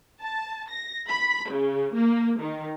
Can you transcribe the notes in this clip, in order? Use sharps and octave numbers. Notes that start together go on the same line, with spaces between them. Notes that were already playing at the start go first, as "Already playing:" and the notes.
A5
A#6
B5
C#3
A#3
D#3